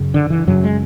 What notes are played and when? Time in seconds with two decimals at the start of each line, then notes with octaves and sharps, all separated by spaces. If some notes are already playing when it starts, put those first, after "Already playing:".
Already playing: F#2 C#3
0.14 D3
0.30 E3
0.47 F#2 C#3 F#3
0.64 G#3